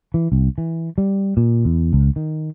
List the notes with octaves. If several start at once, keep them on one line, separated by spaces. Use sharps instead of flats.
E3
C2
E3
G3
A#2
E2
C#2
D#3